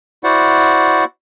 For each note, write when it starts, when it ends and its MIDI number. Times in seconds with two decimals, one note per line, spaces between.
0.24 1.04 64
0.24 1.04 66
0.24 1.04 72
0.24 1.04 74
0.24 1.04 78